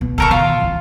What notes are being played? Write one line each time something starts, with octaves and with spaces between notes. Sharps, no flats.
B2
D3 A4 A#4 C#6
B2 D#3 F4
F3 C#4